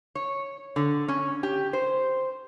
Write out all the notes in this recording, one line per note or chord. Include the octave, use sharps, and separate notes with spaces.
C#5
D3
C#4
G4
C5